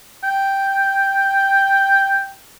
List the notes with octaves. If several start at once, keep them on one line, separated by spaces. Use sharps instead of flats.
G5